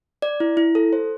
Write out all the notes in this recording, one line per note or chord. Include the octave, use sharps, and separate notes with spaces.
D5
E4
E4
A4
C5